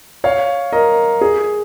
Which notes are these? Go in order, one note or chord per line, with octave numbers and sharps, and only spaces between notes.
C#5 F5
A#4 D#5
G#4